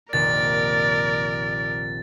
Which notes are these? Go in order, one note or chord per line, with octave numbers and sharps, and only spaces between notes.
F1 A#1 D#3 A#4 D5 A6